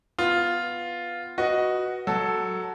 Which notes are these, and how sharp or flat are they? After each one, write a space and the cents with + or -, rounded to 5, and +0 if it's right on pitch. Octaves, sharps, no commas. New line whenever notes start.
B3 +0 F4 +0
F#4 +0 B4 -10 D#5 +0
F#3 +0 A4 +0